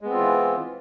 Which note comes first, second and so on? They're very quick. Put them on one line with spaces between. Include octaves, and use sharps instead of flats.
G#3 B3 C4 F4 E3